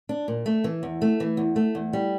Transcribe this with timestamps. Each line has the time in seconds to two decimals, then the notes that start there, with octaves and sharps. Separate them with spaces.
0.09 D4
0.28 A#2
0.46 A3
0.64 E3
0.83 E2
1.02 A3
1.20 E3
1.37 E2
1.56 A3
1.75 E2
1.93 G3